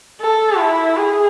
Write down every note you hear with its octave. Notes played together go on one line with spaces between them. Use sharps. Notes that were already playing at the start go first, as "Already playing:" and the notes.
A4
E4
G#4